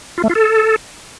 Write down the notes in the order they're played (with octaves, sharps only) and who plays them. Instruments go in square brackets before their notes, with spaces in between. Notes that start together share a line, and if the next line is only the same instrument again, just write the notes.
[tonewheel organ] F4
A3
F4
A4